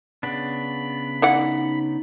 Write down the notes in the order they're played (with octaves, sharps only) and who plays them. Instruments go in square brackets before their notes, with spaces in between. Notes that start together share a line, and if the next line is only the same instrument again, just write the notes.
[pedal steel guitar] C#3 B3 D4 [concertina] B5
[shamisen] E3 D5 F#5 [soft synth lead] D#4